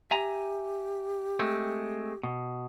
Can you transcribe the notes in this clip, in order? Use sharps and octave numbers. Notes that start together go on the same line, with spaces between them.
G4 E5 G#5 A#5
G#3 A3 C4
B2